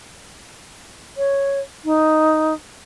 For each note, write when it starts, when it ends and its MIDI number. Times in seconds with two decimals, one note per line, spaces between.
1.17 1.60 73
1.85 2.53 63